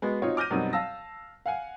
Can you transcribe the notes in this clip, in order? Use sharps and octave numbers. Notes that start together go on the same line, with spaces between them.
G#3 B3 F#4
C4 D#4 F4 F#4 C#5
D6 F6 G6 A#6 D#7
F#2 B2 F#3 G3 C4 D#4
F5 A5 E6 A#6
F5 F#5 G#5